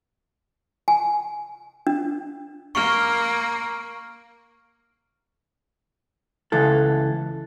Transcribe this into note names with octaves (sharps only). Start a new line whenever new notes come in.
G#5
D4
A#3 C#6 F6
C#2 E3 A4